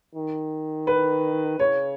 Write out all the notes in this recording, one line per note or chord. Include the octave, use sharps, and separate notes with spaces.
D#3
B4
C#3 C#5